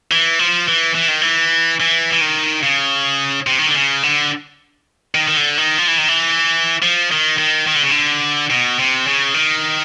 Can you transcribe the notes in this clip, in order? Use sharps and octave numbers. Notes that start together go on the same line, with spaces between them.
E3
F3
E3
E3
D#3
E3
E3
E3
D#3
C#3
C3
D#3
D3
C#3
D3
D#3
D#3
D3
D#3
F3
E3
D#3
E3
F3
D#3
D#3
D#3
D3
C#3
D3
B2
C3
C#3
D#3